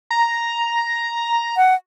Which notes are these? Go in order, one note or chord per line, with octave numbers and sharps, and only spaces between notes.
A#5
F#5